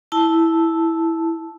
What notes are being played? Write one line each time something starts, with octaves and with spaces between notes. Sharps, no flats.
E4 A5